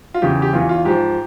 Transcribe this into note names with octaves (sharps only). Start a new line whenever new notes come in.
F4
E2 C#3 E3 G4
G4
E2 E3 F4
F4
G#2 F3 G4